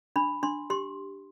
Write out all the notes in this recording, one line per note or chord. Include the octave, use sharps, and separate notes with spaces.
D4 B5
D4 C6
G4 C6